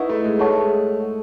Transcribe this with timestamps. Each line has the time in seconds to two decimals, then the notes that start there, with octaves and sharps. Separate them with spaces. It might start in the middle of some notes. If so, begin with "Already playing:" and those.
Already playing: D#4 E4 B4 F#5 C#6
0.09 A3
0.24 G#3
0.39 A3 G#4 C#5 F#5 A5 C#6
0.50 A3
0.60 G#3